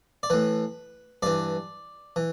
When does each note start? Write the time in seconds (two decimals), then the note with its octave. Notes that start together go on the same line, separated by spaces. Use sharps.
0.23 D5
0.30 A2 E3 B4
1.22 G2 E3 D5
2.16 E3